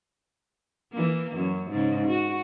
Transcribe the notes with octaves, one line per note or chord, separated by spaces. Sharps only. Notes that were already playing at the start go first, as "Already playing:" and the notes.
E3 A#3
F#2
G#2 C#3
F#4